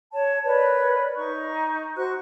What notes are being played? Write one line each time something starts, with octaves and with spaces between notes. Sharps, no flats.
C#5 A5
A#4 B4 C#5 D5
D#4 C#6
F#4 C5 C#6 F#6